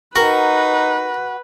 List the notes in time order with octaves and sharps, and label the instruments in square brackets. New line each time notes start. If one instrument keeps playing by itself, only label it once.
[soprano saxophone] D#4 [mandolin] F#4 [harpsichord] A#4 [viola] B4